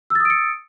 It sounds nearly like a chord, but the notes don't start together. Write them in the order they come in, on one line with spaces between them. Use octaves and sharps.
E6 A6 D#6 D7 C#7